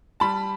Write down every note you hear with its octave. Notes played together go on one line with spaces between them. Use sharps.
G3 A5 B5